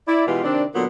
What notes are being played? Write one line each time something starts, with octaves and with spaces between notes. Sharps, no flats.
E4 D5
B2 E3 G#3 F4 G4 B4
C3 D#3 C4 D4
A#2 D3 F#3 B3